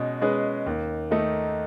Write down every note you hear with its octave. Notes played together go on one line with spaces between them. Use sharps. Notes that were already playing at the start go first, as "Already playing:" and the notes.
Already playing: B2 G#3 C#4
G#3 C#4 G#4 B4
D#2
D#3 A3 D#4